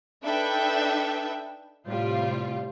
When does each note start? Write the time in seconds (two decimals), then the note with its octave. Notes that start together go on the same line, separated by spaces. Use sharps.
0.24 D4 D#4 A4 B4 E5 G5
1.87 A2 C3 G3 F4